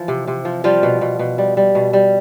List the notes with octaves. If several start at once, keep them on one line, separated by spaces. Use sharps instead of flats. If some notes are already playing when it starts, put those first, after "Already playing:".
Already playing: E3 F3
C3
C3
F3
F3 G3 F4
B2
B2
B2
G3
G3
B2
G3